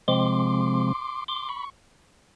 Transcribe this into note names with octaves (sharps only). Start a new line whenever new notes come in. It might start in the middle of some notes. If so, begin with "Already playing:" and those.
C3 F3 G#3 C4 C6 D6
C6 D6
B5 C#6